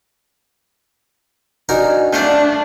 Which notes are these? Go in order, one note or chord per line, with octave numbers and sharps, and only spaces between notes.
D4 D#4 F#4 A#4 G#5
A3 D4 F5 F#5 G6